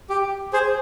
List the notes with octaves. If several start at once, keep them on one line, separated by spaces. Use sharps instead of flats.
G4
G#4 C5